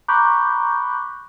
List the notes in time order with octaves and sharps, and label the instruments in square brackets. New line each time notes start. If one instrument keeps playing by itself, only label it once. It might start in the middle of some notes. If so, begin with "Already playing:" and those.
[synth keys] A#5 B5 C#6 D6 F#6 G6